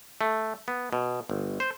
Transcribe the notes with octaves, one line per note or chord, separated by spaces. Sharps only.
A3
B3
B2
G1
C5